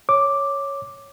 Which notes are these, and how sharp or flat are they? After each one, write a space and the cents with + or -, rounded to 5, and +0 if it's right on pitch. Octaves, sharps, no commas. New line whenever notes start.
C#5 +0 D6 +0